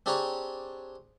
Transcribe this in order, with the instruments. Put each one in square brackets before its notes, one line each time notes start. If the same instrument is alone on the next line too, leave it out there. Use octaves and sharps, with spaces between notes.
[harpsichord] C4 D4 G4 G#4 C#5 A#5